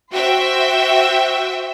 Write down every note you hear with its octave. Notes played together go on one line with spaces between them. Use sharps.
F#4 C5 E5 G5